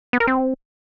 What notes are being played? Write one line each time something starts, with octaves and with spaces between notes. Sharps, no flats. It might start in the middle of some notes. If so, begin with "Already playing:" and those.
B3
A#4
C4